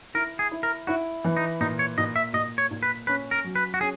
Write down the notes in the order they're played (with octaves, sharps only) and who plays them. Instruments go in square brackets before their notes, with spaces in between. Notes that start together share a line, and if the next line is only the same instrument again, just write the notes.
[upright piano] E4 [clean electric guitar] A#4
[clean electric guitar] G#4
[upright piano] E4
[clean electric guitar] A#4
[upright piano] E4 [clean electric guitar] F#4
[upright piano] E3
[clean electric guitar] D#4
[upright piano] A#2 [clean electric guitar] D#4
[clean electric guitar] C#5
[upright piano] A#2 [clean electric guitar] D#5
[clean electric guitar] E5
[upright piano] A#2 [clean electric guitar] D#5
[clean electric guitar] C#5
[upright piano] A#2
[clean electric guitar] B4
[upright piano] C#4 [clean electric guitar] B4
[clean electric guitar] A#4
[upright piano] F#3
[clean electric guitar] B4
F#4
[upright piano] C#4 [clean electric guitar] G#4